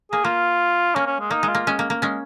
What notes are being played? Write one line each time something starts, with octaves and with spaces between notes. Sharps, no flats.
A#3 G#4
A#3 F4
A#3 C#4
C#4
G#3
A#3 D#4
G#3
F4
A#3
G#3 C#4
A#3
A#3
G#3 C#4